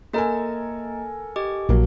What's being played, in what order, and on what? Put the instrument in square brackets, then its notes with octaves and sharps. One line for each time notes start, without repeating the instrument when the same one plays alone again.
[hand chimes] A#3 D#5 A#5 [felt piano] A4 A#4 G#5
[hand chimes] G4 D#5 D6
[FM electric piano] A#1 [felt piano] F#3 A#3